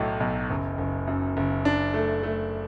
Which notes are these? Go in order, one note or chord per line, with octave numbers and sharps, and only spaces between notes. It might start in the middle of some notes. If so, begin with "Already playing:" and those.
Already playing: B1 A2 F#3
B1
F#1
F#1
F#2
F#1
D4
A3
A3